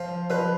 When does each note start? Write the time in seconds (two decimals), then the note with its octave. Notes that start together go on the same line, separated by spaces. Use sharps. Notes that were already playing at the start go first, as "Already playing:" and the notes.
Already playing: F3 C5
0.30 F3 B4